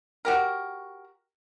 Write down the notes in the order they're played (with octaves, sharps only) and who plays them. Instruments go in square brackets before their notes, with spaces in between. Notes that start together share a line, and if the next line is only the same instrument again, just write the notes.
[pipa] F#4 G4 A#4